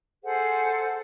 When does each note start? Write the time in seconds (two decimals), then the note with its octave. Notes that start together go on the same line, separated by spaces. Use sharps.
0.24 G#4 A4 C5 F#5